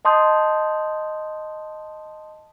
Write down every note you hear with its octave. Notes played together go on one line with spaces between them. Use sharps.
D#5 A5 C6 D#6 G6